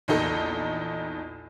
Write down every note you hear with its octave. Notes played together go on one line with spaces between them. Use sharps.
A#1 E2 D#4 A4